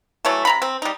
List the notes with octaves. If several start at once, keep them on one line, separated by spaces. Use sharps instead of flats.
E3 F#3 A3 C#5
C3 A#5 B5
C4
G3 D#4